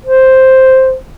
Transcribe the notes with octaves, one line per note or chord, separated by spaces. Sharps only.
C5